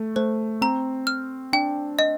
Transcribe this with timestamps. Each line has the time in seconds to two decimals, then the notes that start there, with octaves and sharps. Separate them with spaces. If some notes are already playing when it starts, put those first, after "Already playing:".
Already playing: A3
0.16 A3 C5
0.61 C4 A#5
1.07 F6
1.53 D4 G5
1.99 D#5